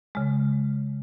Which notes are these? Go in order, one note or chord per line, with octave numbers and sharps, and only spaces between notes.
C#3 G#3